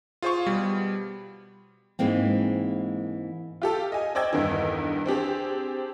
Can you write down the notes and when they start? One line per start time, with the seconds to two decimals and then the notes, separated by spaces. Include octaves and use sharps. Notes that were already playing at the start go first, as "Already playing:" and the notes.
0.22 F4 G#4 C5 F5 C#6
0.47 B2 G3
1.99 G#2 E3 G#3 A#3 C4
3.62 F4 G4 A4
3.92 D#5 G#5
4.15 C5 D5 D#5 G5 E6 G#6
4.33 E2 G2 D3 D#3 D#4
5.06 C4 D4 G4 G#4